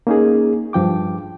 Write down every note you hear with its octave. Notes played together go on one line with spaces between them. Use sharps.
A#3 C#4 D#4 G#4
G2 F3 G5 D6